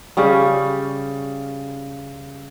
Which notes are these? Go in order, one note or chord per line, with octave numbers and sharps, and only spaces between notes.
C#3 G3 C#4